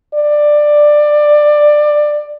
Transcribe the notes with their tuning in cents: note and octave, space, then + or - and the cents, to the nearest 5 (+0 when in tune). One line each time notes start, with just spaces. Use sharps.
D5 +15